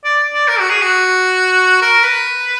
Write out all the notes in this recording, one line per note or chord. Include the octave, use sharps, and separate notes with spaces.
D5
D5
A#4
F#4
G#4
F#4
A#4
B4